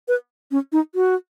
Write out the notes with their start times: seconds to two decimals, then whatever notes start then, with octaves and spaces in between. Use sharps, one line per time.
0.08 B4
0.51 C#4
0.72 D#4
0.95 F#4